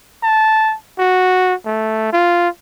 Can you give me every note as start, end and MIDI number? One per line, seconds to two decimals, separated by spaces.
0.23 0.74 81
0.99 1.54 66
1.66 2.09 57
2.13 2.49 65